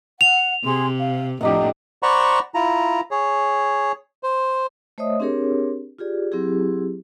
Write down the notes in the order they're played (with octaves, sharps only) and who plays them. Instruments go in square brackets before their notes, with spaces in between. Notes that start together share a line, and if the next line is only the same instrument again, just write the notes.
[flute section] F#5 [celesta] F7
[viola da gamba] C3 [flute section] G#4 C6
[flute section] F5
[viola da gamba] F2 A2 D4 [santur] G4 D#5 F#5 [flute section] A#5
[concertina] C5 D5 F#5 A#5 B5 C#6
E4 F4 A#5
G#4 C#5
C5
[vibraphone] A3 C5 C#5 D#5 E5 D#6
C4 D4 G4 G#4 A#4 C#5
F4 G4 G#4 D5
F#3 C4 E4 G4 G#4